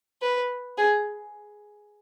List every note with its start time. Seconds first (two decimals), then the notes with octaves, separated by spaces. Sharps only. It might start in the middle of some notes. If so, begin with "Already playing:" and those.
0.22 B4
0.78 G#4